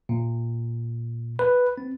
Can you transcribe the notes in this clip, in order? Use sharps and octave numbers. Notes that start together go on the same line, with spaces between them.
A#2
B4
C4